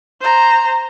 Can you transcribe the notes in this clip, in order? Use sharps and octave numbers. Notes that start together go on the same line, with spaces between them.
C5 A#5